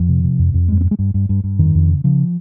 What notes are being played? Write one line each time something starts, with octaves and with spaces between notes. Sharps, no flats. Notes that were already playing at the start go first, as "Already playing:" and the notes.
Already playing: F2 F3
C3
C3
F2
F2
G2 G#3
C4
G2
G#3
G2
G2
G2
G2
F2 D#3
F2
C#3
C#3 F3